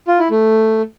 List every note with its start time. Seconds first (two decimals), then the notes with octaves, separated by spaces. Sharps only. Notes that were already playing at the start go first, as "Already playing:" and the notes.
0.08 F4
0.19 E4
0.30 A3